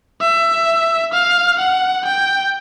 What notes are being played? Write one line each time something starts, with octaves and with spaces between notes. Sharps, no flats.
E5
F5
F#5
G5